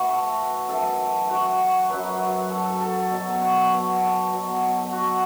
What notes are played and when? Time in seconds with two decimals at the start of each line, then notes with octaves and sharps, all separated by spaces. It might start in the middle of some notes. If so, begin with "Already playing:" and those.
Already playing: A2 E3 F#4 B4
0.08 A4
0.68 F#2 E3 A4
1.30 F#4
1.90 F#2 F#3 B4
2.51 A4
2.66 A4
2.81 A4
3.11 B2 F#3
3.41 F#4
3.56 A4
3.72 B4
4.02 A4
4.32 B2 F#3
4.78 A4
4.92 F#4